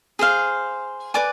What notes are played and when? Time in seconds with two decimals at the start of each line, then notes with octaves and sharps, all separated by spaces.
0.19 G#4 C5 F5
1.14 B4 D5 G#5 D6